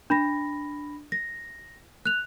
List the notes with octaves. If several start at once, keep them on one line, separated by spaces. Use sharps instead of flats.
D4 B5 A#6
A#6
F#6 F7